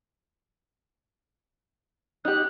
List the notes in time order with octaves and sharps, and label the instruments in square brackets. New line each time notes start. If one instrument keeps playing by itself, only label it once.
[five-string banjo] D#4 G4 [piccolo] F#6